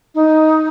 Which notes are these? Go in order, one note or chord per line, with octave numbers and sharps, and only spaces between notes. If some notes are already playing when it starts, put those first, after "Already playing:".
D#4